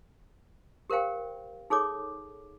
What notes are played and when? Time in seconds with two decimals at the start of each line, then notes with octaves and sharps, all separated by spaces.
0.90 G4 A#4 C5 F5 G5
1.70 D#4 G#4 A4 C#5 D6